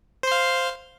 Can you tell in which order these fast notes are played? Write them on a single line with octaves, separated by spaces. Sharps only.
C5 C6 F5